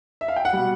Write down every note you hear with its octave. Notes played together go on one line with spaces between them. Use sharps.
E5
F5
G5
F#5
B2 G3